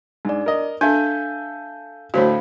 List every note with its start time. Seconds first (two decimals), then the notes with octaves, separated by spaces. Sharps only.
0.25 G#2 D4 D5
0.46 A#4 D#5
0.81 D4 A4 E5 F5 G#5 G6
2.14 D2 A2 F#4 C5 C#5 F5 B5